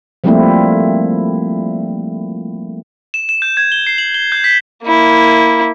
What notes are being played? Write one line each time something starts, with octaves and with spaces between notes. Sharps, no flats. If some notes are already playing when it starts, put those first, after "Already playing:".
F3 G3 A3 A#3 C4 E4
E7
E7
G6
G#6
G7
C7
F#7
G7
G6
B6
A#3 E4